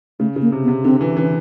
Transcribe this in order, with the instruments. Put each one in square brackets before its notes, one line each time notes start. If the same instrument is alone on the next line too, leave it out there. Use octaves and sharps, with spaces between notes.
[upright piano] C#3 [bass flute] A3
[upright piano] C#3
[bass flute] A#3
[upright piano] C3
[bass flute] B3
[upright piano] C3
[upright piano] D3 [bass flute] C4
[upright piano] E3
[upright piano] E3 [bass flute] C#4